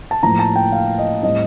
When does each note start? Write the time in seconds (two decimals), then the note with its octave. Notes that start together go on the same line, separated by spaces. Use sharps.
0.11 A5
0.23 A2 F3 A#3 A#5
0.39 A5
0.56 G5
0.72 F5
0.98 D#5
1.23 A2 G3 C4 D#5